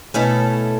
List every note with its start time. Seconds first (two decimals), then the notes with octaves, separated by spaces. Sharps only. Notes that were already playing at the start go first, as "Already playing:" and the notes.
0.14 B2 A3 C#4 E4 A4